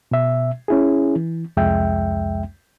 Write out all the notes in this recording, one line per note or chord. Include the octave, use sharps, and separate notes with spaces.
B2 E5
C#4 E4 G#4
E3
C2 F2 G#3 E5 G5